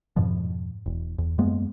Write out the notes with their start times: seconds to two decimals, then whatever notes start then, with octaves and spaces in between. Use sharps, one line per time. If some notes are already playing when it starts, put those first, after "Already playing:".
0.16 F2 G#2 B2 F3
0.86 E1
1.18 E2
1.38 F#2 G#3 A#3 B3